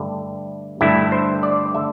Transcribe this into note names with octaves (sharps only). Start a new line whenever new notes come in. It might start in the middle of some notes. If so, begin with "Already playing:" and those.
Already playing: G2 D3 A3
G2 D3 A3 E4
C5
D5
D3 A3 E5